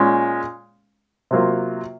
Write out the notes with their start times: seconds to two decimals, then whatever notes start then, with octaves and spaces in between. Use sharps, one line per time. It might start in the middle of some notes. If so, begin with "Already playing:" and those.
Already playing: A#2 G#3 C#4
1.31 C3 F#3 A#3 F4